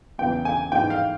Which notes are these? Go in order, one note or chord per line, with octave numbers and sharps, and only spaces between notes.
E2 C#3 E3 G5
G#5
G#2 E3 G5
F5